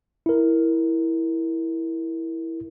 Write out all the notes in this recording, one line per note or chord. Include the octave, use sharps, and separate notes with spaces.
E4 A#4